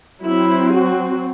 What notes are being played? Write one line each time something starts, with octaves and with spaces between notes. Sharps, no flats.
F#3 C4 E4
F#4